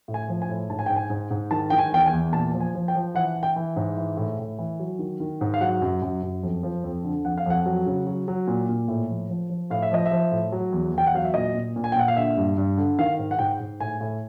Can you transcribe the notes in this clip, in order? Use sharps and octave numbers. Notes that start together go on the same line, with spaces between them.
A2
G#5
F3
G#5
A2
G#2 A5
G#5
G#2 G5
G#5
G#2
G#2
D#3 A5
D#3 G5
G#5
E2 G5
G#5
E2
A#2 A5
F3
G#5
F3
G5
F3
E3 F#5
E3
G5
E3
G#2
E3
A2
A2
E3
F#3
D#3
D#3
G#2
F5
F#3 F#5
F#2
F#2
F#2
F2
F3
F2
D3
F2 F#5
F5
F2 F#5
F#3
C#3
F#3
F#3
A#2
A#2
A2
F3
F3
F3
A2 F5
E5
F3 D#5
E5
F3
A2
F#3
E2
E2 G5
F#5
F#3 F5
E5
A#2 D#5
A#2
A#2
G#5
G5
A#2 F#5
F5
D3 E5
G2
G2
D3
D#3 F5
G#2
F#5
G#2 G5
G#2
A2 G#5
A2